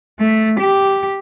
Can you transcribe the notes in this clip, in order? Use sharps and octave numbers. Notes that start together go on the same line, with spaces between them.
A3
G4